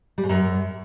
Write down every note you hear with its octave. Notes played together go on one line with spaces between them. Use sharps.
G3
G#2
F#2